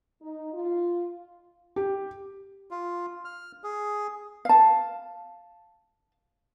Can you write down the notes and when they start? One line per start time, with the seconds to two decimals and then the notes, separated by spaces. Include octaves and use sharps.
0.22 D#4
0.53 F4
1.76 G4
2.71 F4
3.25 F6
3.64 G#4
4.45 F5 A5